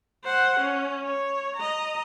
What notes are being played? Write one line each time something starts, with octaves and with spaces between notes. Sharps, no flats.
C5 F#5
C#4
C#5
D#5 A#5